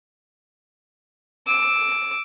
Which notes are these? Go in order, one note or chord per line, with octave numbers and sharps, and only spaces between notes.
D6 E6